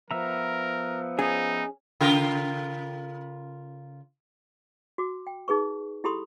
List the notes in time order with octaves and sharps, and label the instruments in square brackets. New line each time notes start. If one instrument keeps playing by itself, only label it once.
[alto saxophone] F3 [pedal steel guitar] B3 E5 A#5 [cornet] A#4
[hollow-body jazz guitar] C#4 G#4 [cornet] D#4
[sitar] C#3 F4 A#4
[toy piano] F#4 D6
G5
D#4 G#4 B4 C#6
E4 G4 A4 B5 C6 D#6